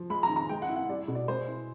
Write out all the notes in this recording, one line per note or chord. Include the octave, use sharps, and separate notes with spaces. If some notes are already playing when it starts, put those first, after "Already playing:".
Already playing: F3
G#3 B5
A#5
D#3
A#5
G#3 G5
F#5
E4
F#5
G3 D5
B2
D5
G#3 C5
E4